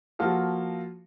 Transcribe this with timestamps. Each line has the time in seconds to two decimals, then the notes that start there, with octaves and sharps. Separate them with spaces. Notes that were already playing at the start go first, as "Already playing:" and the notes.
0.19 F3 A#3 F4 F#4 A4